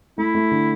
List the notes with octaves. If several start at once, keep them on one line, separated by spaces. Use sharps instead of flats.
A3 E4
A3
D3